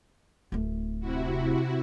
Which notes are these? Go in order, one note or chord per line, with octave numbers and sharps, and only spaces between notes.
D1 A3
C3 E4 F#4